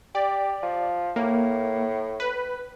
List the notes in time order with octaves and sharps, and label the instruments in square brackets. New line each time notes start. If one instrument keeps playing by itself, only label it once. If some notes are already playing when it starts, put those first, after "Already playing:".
[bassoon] G4 [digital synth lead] D5
[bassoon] F3
[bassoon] A2 [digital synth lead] A#3
[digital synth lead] B4